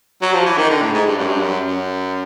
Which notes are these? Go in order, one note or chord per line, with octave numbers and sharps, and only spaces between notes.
F#3
F3
E3
D#3
D3
A2
G#2
G2
F#2
G2
F#2
F#2